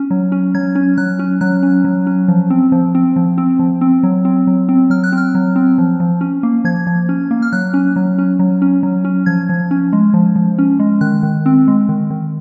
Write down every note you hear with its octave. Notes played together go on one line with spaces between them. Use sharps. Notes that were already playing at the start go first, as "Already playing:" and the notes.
Already playing: C#4
F#3
C#4
F#3 G#6
C#4
F#3 F#6
C#4
F#3 F#6
C#4
F#3
C#4
F3
C4
F3
C4
F3
C4
F3
C4
F#3
C4
F#3
C4
F#3 F6
F#6
C4
F6
F#3
C4
F3
F3
C#4
A#3
F3 G#6
F3
C#4
A#3
F6
F#3 F#6
C#4
F#3
C#4
F#3
C#4
F#3
C#4
F3 G#6
F3
C#4
G#3
F3
F3
C#4
G#3
D#3 F#6
D#3
C4
G#3
D#3
D#3